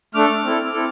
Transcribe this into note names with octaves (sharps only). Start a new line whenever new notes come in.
A3 D4 A4 D6 F6
C4 E4 A4
C4 E4 A4